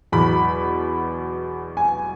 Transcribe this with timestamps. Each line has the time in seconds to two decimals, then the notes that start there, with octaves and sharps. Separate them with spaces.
0.12 E2 B2 F#3 B5
1.77 G#5